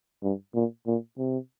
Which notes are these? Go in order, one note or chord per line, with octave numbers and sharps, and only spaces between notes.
G2
A#2
A#2
C3